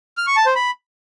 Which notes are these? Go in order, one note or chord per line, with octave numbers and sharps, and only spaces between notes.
F6
C#6
A5
C5
B5